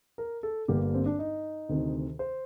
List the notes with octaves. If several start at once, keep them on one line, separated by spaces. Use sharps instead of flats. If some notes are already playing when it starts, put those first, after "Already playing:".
A#4
A4
G1 G2 D3 G3 A#3 G4
C4
D4
D#4
D2 C3 D#3
C5